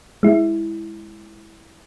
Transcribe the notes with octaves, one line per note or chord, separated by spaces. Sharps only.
G#3 E4